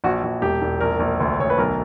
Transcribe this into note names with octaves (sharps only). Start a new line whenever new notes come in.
A#1 F#4
A#1
E1 G4
E1
A#1 A#4
A#1
D2
D2 C#5
B4
B1 A#4